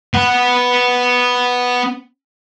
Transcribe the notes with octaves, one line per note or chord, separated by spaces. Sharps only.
B3 F#5